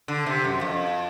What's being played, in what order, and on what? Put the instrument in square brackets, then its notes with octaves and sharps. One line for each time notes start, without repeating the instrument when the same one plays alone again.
[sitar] D3
C3
F#2
F2